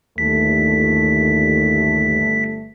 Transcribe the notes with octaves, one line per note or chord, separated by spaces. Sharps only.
G1 D#2 A3 B6